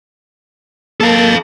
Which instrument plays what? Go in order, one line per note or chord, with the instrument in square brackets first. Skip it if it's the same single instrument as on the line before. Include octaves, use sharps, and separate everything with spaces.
[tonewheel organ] A#3 A5 [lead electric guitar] A4 F5